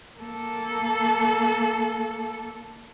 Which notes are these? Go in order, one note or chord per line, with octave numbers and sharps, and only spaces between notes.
A#3 A4